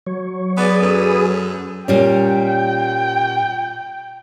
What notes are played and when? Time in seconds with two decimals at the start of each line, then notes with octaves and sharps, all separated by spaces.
0.07 F#3 C#5
0.57 B3 G#4 B4 D5 D#6
0.82 F#2 A4
1.88 A#2 G3 C#4 G5